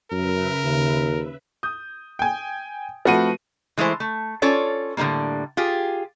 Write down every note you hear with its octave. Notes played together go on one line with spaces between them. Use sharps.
F#2 C#3 A#4 B4 E5
D#2
D#6 G6
G5 G#5
F3 A3 C4 F#4 B4 D#7
E3 G#3 A3 E4 C5
A3
C#4 F4 A4 C#5 D5
A2 D3 E3 G3 A#3
F4 G4 G#4